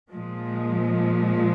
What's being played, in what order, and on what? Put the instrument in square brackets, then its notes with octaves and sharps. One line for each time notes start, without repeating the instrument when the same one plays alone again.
[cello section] A#2 F3 G#3